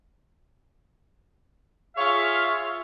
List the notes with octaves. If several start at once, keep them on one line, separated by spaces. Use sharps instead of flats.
F4 G#4 C#5 E5 F5